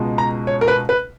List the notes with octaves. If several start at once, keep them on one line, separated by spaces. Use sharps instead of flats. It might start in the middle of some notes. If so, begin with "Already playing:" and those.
Already playing: C#2 B2 G#3
A#5
C#5
A#4
B4
B4